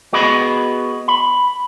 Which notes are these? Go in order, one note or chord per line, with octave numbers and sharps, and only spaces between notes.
B3 F#4 G#4 D#5 B5
B5